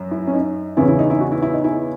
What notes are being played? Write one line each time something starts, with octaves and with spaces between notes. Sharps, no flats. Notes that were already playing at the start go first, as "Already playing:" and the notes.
Already playing: F#2
E4
C#4
D#4
E2 C#3 E3 E4
E4
D#4
E4
F#4
E4
E4
D#4
E4